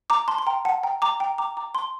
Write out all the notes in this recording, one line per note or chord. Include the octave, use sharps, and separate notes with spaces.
A#5 D6
A5 C6
C6
G5 A#5
F#5 A5
G5 A#5
A#5 D6
G5 A#5
A#5 D6
A#5 D6
A5 C6